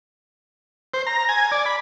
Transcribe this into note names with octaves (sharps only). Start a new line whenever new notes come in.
C5
A#5
G#5
D5
B5